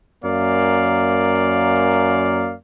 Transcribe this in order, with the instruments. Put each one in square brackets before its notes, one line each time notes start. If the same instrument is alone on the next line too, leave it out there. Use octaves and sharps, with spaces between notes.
[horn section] F#2 A#3 D5 F5